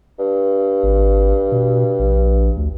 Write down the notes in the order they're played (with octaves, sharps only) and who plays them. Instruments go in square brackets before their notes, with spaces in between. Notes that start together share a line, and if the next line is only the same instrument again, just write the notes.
[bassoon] G2
[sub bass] G#1
B2
A#1
D2